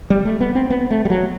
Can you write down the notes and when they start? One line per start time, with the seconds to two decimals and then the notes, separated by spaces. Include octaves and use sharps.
0.10 G3
0.25 A3
0.40 B3
0.55 C4
0.70 B3
0.91 A3
1.05 G3
1.10 F#3